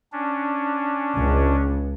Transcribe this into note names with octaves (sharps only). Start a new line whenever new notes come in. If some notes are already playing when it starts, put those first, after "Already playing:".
C#4 D4
C#2